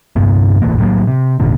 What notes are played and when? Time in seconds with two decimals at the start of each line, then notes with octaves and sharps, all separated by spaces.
0.16 G1 G2 C3 B3
0.62 E1 A2 E3 A#3
0.78 A2 F#3 G3 A#3
1.07 C3
1.40 G#1 E2 A#2 D3